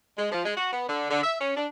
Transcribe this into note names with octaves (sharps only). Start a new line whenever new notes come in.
G#3
F3
G#3
F#4
B3
D3
D3
E5
C#4
D4